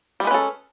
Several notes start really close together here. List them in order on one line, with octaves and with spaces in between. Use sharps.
G3 G#3 B4 C#4 A4